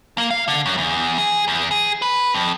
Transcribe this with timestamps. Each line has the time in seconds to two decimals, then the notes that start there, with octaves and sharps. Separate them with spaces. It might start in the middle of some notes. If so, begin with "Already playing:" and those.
0.18 A#3
0.30 F5
0.48 D3
0.66 F#2
0.78 E2
1.18 G#4
1.48 E2
1.71 G#4
2.02 B4
2.34 F2